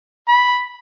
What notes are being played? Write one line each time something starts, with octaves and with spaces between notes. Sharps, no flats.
B5